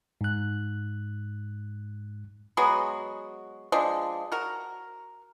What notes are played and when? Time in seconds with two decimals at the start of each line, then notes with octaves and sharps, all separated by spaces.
0.21 G#2 F#6
2.57 F#3 G#3 B3 F#4
3.72 F3 G#3 D4
4.32 F#4 A#4